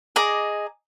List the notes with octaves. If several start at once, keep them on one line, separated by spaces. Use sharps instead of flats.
G#4 D#5 A#5 D6